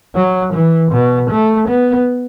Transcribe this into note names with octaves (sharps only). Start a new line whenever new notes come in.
F#3
E3
B2
A3
B3